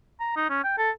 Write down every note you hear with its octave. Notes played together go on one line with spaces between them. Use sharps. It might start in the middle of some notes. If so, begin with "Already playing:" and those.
A#5
D#4
C#4
G5
A4